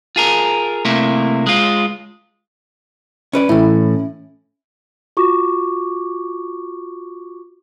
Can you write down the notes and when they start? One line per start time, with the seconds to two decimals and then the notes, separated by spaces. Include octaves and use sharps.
0.16 F4 G#4 A#4
0.85 C3 A3 A#3 E4
1.47 G#3 F4
3.33 C#4 B4 D5
3.49 A2 E3 C#4 E4
5.17 F4 F#4 C#6 D6